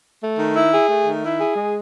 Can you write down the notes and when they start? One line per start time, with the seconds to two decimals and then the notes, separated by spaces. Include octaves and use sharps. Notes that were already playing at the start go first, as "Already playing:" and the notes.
0.20 A3
0.38 D#3
0.54 E4
0.71 G#4
0.88 A3
1.05 D#3
1.22 E4
1.38 G#4
1.55 G#3